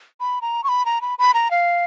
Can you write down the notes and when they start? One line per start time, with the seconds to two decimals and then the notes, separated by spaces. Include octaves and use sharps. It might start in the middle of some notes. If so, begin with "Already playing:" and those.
0.20 B5
0.42 A#5
0.64 C#6
0.69 B5
0.85 A#5
1.01 B5
1.19 B5
1.34 A#5
1.51 F5